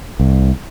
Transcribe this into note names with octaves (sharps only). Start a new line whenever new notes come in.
C2